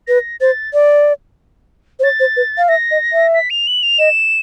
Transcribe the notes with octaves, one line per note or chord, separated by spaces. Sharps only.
B4 A#6
C5 A6
D5
C5
C#5 A6
C5
B4
F5
E5 A#6
D#5
E5
B6
F7
F#7
F7
D#5 E7